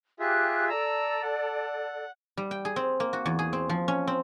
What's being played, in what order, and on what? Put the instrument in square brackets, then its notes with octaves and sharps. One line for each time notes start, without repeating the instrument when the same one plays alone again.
[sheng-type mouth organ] F4 G#4 E5 [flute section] G4 F#6
[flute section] A4 D5 [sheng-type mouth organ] A#5 E6
[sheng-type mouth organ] F#5
[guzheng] G3
G5
G#4
C4
A#3
F#4
E2
G#4
C4
F3
C#4
C4